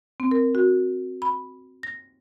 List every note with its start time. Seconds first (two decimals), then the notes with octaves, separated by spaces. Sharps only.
0.20 C4
0.31 A#4
0.55 F#4
1.22 B5
1.83 A#6